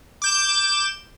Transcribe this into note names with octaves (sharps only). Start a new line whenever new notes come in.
D6 G6 E7